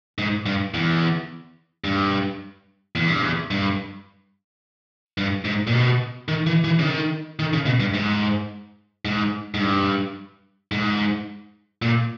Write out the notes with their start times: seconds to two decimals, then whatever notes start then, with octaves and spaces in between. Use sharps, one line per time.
0.18 G#2
0.46 G2
0.74 E2
1.84 G2
2.95 E2
3.08 G2
3.21 E2
3.51 G2
5.18 G2
5.45 G#2
5.67 A#2
5.73 B2
6.28 D#3
6.46 E3
6.64 E3
6.79 C#3
6.83 D#3
7.39 D#3
7.53 C#3
7.66 B2
7.80 G2
7.94 G#2
9.05 G#2
9.54 G#2
9.60 G2
10.71 G#2
11.82 A#2